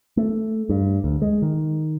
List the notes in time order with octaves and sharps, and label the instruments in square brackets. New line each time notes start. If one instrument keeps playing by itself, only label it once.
[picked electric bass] A3
G2
D2
G#3
D#3